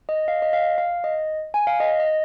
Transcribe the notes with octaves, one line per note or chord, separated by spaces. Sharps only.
D#5
F5
D#5
F5
F5
D#5
G#5
F5
D#5
D#5